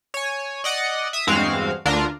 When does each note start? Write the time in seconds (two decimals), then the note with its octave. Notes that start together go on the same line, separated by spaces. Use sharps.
0.14 C#5 G#5
0.64 D5 D#5 F#5
1.13 E5 D#6
1.27 E2 G2 G#3 C4 F#4 F5
1.85 D2 D3 D4 F4 A#4